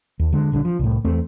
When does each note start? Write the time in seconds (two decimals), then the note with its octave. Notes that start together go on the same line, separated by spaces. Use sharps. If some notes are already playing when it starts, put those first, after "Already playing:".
0.19 D#2
0.33 D3 G#3
0.52 A#1 D3 G3 D4
0.65 F3
0.79 C2 A2
1.05 E2 A3 C4